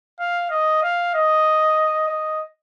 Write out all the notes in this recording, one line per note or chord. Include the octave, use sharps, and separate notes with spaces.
F5
D#5
F5
D#5
D#5